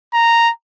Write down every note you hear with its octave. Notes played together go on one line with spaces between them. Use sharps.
A#5